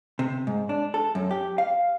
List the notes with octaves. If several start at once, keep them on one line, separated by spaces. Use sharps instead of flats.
C3
G#2
D4
A4
F#2
G4
F5